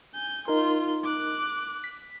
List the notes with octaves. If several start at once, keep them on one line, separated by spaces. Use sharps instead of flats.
G#5 G6
D#4 F4 A#4 C6
D6 F#6
B6